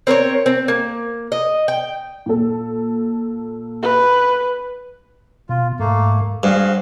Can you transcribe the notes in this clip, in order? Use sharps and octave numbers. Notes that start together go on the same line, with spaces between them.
C4 A#4 C5 C#5
C4
A#3
D#5
G5
A#2 A4
B4
B2 F4
G#2 A3 A#3
G2 F#4 G#4 C5 F5